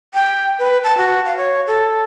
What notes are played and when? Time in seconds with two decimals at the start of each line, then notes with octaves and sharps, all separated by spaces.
0.14 G5
0.59 B4
0.84 A5
0.98 F#4
1.26 F5
1.37 C#5
1.67 A4